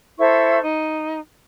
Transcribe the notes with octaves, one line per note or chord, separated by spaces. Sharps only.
E4 A4 C5 C#6
D#4